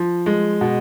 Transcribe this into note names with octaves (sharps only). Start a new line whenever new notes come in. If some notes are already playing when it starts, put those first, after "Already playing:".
Already playing: F3
G#3
B2